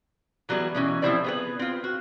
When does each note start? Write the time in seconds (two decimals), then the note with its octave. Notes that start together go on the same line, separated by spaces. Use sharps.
0.49 E3 F#3 G3 B3 G#4
0.75 B2 E3 C#4
1.02 F3 G3 C4 E4 C5 D5
1.24 B3 G#4 B4
1.59 C4 F4
1.84 F#4